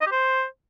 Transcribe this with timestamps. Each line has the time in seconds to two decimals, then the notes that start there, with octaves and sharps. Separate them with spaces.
0.01 D#5
0.06 G4
0.12 C5